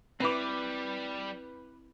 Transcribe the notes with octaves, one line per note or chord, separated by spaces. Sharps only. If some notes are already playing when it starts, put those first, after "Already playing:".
G3 C4 E4 B4 D6